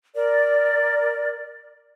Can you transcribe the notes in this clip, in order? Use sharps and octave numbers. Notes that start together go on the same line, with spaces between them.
A#4 D5